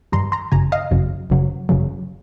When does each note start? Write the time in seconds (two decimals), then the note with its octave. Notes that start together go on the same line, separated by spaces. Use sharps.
0.12 G2 D#3 G3 A#5 C6
0.32 A#5 C6
0.52 G1 F#2 C#3 F#3 G#5 A#5
0.72 D#5 F5
0.91 G1 F#2 C#3 F#3
1.30 G1 F#2 C#3 F#3
1.69 G1 F#2 C#3 F#3